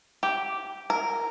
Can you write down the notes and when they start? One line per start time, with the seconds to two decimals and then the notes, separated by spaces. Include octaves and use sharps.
0.23 G4
0.90 A#4